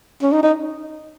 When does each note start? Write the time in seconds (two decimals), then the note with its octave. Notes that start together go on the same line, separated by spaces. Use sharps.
0.22 C#4
0.32 D#4
0.43 D#4